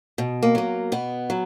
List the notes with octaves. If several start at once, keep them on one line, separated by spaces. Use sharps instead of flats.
B2
A#3
F#3 A#3
B2 B3
F#3